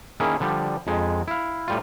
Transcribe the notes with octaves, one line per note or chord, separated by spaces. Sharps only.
D#3 A#3 C#4 E4 G#4
D3 F3 G3
F2 G#3
E4 F5
A2 G3 F4